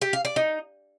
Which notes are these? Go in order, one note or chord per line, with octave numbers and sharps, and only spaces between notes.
G4
F5
D5
D#4